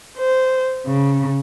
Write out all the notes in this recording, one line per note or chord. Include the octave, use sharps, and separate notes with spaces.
C5
C#3